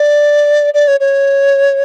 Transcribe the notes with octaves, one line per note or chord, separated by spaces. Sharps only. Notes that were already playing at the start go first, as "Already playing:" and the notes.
Already playing: D5
D5
C#5
C#5